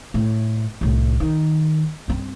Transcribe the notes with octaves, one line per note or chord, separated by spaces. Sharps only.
A2
C2 A2
D#3
G2 C4